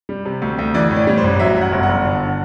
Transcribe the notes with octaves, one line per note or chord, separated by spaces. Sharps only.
G3
C3
D2
D2
E3 D5
A2
D5
G3
C5
A1
F#3 E5
F#2
F#5
G1
F#5
G1
D3